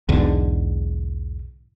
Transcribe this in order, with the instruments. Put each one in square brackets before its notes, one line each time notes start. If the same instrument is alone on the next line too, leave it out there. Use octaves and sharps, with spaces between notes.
[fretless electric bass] B1 E2 G#2 D3